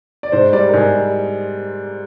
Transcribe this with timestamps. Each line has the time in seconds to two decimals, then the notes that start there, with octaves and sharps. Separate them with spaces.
0.23 D5
0.32 G#2 C5
0.53 G3 D5
0.69 A#4
0.73 G#2 G#4
0.94 G3